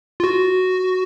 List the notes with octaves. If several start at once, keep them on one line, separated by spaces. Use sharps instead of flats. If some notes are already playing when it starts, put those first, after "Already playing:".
F4
F#4